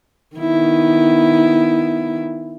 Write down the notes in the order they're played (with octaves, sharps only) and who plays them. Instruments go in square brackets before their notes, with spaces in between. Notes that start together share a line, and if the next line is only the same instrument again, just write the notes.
[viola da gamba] D#3 B3 E4